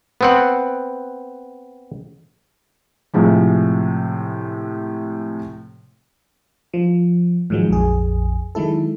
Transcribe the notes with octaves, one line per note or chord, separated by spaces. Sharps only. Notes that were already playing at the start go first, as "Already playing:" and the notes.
B3 C4 F#5
A2 C3 F3 G#3
F3
G#2 D#3 F3 F#3 G#3
A#1 F2 G#4
D#3 F#3 G#3 E4 A4